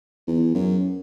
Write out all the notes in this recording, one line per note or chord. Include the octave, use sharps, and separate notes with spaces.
E2
F#2